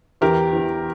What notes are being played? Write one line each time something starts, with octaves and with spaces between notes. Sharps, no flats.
E2 E3 G4 A#4
E2 E3